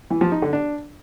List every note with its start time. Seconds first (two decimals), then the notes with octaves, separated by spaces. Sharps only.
0.10 E3
0.21 F3
0.32 D#4
0.42 D3
0.53 D4